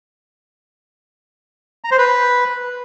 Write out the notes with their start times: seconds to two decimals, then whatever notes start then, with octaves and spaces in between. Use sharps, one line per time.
1.84 A#5
1.91 C5
1.98 B4